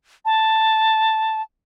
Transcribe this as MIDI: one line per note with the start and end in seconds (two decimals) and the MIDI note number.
0.25 1.42 81